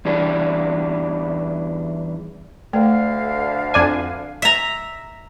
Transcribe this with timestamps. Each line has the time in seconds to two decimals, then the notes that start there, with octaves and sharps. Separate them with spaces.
0.05 E2 E3 G3 D4
2.73 D2 D3 A3 F5
3.74 F2 D4 G#5
4.42 E5 A#5